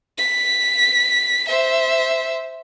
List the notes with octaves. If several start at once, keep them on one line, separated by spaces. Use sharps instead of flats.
B6
C5 E5